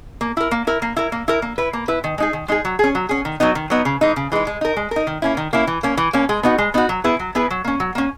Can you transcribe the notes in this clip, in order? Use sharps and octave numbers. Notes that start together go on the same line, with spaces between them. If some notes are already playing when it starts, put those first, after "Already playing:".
A#3
E4 A#4
A#3
E4 A#4
A#3
E4 A#4
A#3
E4 A#4
A#3
E4 B4
A#3
E4 B4
D#3
G#3 D#4 G#4
D#3
G#3 D#4 G#4
F#3
C#4 G#4
F#3
C#4 G#4
D#3
F#3 B3 D#4
D#3
F#3 B3 D#4
C#3
E3 G#3 D#4
C#3
E3 G#3 D#4
G#3
D#4 A#4
G#3
D#4 A#4
D#3
A#3 C#4 E4
D#3
A#3 C#4 E4
E3
A#3 C#4
E3
A#3 C#4
G#3
B3 D#4 F#4
G#3
B3 D#4 F#4
F#3
B3 E4 G#4 B4
F#3
B3 E4 G#4 B4
F#3
A#3 C#4
F#3
A#3 C#4